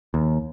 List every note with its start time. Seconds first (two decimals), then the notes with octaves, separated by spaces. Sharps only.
0.14 D#2